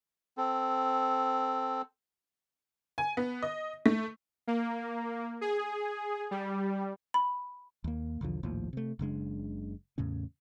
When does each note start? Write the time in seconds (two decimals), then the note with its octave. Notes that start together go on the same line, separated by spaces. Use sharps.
0.38 C4 A4
2.98 G#5
3.17 B3
3.42 D#5
3.86 A3
4.47 A#3
5.41 G#4
6.31 G3
7.14 B5
7.84 D#2 A#3
8.21 B1 E2 D3 F3
8.43 A#1 D#2 A2 F3
8.73 C3 A3
8.99 F#1 C#3 G#3 D4
9.98 E2 A2 C#3 C#4